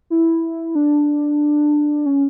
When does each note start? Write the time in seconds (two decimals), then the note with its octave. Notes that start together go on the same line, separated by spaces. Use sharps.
0.10 E4
0.75 D4
2.06 C#4